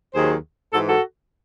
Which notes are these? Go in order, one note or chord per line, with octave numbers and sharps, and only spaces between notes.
D#2 D#3 F#3 G#4 C5
G#2 E3 F#4 A4
F#4 A4